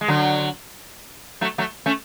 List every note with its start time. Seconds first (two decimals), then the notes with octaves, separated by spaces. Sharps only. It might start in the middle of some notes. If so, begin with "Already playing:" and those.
0.01 G#3
0.08 D3 F#3
1.41 F#3 A3
1.58 F#3 A3
1.86 A3 C#4